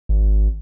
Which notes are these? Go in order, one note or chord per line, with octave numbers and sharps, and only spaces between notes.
G#1